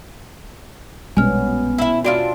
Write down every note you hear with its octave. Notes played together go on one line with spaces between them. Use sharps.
A#1 B2 G3 G#3 B3 C#4 G#5 F6
E4 E5
C4 D4 F4 F#4 D5 D7